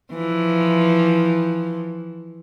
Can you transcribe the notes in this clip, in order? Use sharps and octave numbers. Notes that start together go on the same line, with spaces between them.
E3 F3